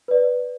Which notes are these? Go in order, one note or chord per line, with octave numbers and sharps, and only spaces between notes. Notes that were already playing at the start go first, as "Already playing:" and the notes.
B4 D5